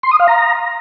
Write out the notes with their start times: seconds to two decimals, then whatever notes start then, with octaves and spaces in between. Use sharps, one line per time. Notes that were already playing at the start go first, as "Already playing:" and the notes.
0.03 C6
0.11 D#6
0.20 F5
0.28 A#5